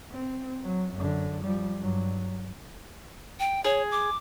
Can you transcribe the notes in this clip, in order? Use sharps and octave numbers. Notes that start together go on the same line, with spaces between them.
C4
F#3
F#2 D3
F3 G3
G2 F#3
G5
G#4 C#5
D6